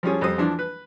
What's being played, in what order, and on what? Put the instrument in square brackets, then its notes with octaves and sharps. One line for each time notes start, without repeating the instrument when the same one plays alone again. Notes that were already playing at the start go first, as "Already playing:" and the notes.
[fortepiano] F3 G3 C#4 G#4
F2 G3 C5 D#6
E3 F3 D4 E4
B4